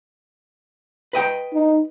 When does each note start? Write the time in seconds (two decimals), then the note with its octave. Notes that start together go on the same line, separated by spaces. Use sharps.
1.13 B4 D#5 G5
1.54 D#4